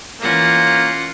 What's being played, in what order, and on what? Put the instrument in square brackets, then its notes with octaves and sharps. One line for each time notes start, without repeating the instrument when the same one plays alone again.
[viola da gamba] E3 C#4 [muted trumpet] A#3 [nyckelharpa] F4 F#5